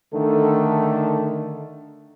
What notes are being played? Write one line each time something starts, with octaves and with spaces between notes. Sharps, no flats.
D3 D#3 A3 A4